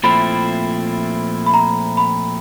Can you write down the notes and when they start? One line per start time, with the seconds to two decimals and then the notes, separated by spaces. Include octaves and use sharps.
0.04 A#2 F3 A3 C4 E4 B5
1.46 B5
1.54 A#5
1.97 B5